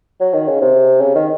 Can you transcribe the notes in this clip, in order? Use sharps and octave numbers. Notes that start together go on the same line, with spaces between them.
F#3
D#3
C#3
C3
C#3
D#3